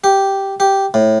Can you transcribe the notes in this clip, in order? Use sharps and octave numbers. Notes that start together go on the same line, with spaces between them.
G4
G4
A2